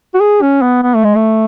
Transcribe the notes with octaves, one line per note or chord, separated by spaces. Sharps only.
F#4
G#4
C#4
B3
B3
A3
G#3
A3